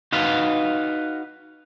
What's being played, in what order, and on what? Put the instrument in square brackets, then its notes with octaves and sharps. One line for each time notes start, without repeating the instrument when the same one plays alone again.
[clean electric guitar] D#4 F#4 B4 F5